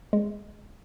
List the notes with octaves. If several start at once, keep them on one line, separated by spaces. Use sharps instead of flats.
G#3